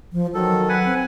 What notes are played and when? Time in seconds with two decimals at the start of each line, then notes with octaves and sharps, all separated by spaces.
0.13 F3
0.34 D#3 F#3 A4
0.69 B4 F#5 G#5
0.85 C4